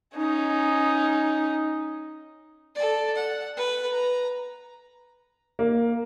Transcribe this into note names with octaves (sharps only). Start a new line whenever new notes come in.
C#4 D#4
A4 D5
F#5
B4
A#5
A#3